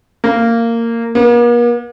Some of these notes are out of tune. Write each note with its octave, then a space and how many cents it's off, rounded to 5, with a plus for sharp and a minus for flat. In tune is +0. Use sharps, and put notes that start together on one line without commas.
A#3 -15
A#3 +45